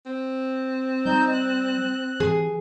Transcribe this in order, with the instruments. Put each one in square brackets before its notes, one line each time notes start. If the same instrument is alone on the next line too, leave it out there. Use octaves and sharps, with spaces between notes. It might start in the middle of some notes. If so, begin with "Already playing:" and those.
[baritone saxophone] C4
[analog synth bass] G3 [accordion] D#4 G6
[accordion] F#6
[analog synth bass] E3 [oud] G#4